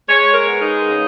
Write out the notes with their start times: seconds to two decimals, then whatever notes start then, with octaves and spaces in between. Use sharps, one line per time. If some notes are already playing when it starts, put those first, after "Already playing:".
0.08 G#3 C#5
0.34 A#4
0.47 B3
0.60 D#4
0.85 C#3